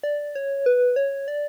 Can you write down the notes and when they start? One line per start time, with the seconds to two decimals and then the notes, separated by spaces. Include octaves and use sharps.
0.03 D5
0.35 C#5
0.66 B4
0.96 C#5
1.28 D5